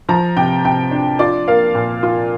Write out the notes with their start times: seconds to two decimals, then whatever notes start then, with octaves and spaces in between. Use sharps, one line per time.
0.09 F3 A#5
0.37 C3 G5
0.65 C3 G5
0.91 D4
1.19 F4 D5
1.48 A#3 F5
1.75 A#2
2.03 F4